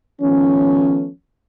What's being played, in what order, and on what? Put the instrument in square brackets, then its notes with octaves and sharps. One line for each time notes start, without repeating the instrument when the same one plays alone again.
[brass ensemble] D#3 F3 A3 B3 C#4